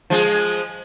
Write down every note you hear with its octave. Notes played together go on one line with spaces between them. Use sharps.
F3 G#3